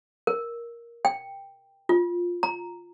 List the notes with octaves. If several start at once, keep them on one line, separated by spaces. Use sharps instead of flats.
A#4
G5
F4
A#5